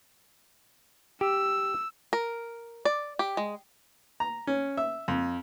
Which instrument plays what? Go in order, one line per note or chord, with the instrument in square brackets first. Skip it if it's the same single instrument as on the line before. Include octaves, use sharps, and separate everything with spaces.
[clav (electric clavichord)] G4 [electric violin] E6
[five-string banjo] A#4
D5
G4
G#3
[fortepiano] A#5
C#4
E5
F2